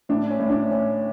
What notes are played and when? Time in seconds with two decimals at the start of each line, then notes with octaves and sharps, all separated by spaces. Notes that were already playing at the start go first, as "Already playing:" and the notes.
0.09 A2 D4
0.30 C#4
0.40 A2
0.50 D4
0.71 A2 C#4